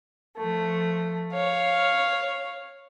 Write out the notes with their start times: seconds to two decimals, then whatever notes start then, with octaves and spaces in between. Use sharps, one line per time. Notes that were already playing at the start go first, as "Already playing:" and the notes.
0.37 F3 A3
1.32 C#5 F5